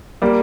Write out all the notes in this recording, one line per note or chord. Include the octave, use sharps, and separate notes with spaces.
G3 A#3